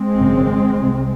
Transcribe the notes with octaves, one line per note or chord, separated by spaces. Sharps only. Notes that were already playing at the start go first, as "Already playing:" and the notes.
Already playing: G#3 C4
G#1 F#2 C#3
C2 C3